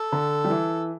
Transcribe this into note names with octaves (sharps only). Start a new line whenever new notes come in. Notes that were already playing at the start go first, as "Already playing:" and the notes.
Already playing: A4
D3
G3
E3